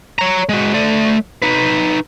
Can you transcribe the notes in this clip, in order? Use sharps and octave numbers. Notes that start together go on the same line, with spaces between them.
C#5 A#5
G#3 F#4
A3 D5
D#4 B4